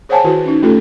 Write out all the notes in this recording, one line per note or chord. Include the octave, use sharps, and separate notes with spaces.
G#4 C5 C#5 F#5 G#5 A5
D#3 E4 F#4 B4
C#4 D#4
A3 C#4 F4 G4 A4